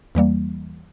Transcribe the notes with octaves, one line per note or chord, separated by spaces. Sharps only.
E2 E3 G3 A#3